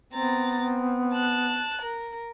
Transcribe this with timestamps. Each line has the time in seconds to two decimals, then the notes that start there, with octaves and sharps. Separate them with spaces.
0.13 B3 C4 A#5 A6
0.60 C4
1.13 A5 F#6
1.81 A#4